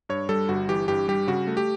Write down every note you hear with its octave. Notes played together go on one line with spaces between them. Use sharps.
G2 C#5
G3 A4
G1 F#4
E3 G4
G2 G4
G3 G4
C#3 F#4
A3
G4